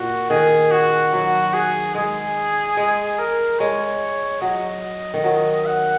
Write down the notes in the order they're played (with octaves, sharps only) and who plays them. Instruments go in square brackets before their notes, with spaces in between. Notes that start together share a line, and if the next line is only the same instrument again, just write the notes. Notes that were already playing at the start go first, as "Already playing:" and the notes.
Already playing: [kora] A#2 [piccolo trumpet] F#4
[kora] D#3 [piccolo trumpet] G#4
[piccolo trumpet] F#4
[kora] F#3
[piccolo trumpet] G#4
[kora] G#3 [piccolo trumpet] G#4
[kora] G#3
[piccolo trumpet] A#4
[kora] G#3 [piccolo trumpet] C#5
[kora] F#3 [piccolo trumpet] D#5
[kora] D#3
F#3
[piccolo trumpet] F#5